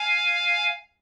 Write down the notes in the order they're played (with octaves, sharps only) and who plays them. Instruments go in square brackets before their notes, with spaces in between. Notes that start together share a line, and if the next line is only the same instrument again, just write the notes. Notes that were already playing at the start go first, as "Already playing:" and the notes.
Already playing: [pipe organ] F5 G#5